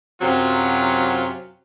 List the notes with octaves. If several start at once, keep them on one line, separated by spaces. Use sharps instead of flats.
F#2 C3 F#3 C4 F4